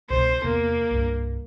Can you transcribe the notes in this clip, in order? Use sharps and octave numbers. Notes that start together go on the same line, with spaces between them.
C2 B2 C5
E2 C3 A#3 B3
C2 G2